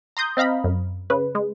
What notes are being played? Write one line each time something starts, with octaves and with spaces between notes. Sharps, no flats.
A#5 C6 D#6 G6
C4 D#5 F5 A#5 B5
F#2
C#3 B4
G#3